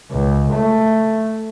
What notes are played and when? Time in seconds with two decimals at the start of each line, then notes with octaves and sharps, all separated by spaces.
0.11 C#2
0.54 A3